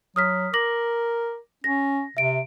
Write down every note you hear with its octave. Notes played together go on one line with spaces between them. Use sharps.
F#3 D#6 F6 B6
A#4 D6 A#6 F#7
C#4 A#6
C3 E5 D7